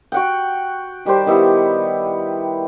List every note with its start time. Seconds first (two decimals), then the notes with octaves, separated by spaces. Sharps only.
0.12 F#4 F#5 G5
1.05 D#3 G3 G4 C5
1.26 D#3 B3 E4 G4